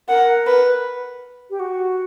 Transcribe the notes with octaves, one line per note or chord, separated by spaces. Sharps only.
A#4 F#5
B4
G4
F#4